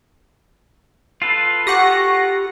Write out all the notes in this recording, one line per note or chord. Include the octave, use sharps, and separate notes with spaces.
F4 A4 B4
G4 F#5 C#6 A#6